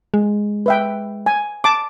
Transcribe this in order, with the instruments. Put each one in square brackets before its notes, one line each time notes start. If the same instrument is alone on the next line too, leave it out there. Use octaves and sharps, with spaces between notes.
[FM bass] G#3
[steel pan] B4 E5 G5
G#5
A5 D6